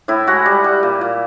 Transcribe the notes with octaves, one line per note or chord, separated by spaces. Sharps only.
A2 E4
G#3 F#4
G3
G3
A#2
A#2